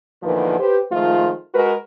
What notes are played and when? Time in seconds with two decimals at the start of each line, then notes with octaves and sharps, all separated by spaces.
0.22 E2 A#2 D3 D#3 F3 B4
0.59 G4 B4 C5
0.91 D#3 F3 G#3 A3 F4
1.54 G#3 F#4 A#4 B4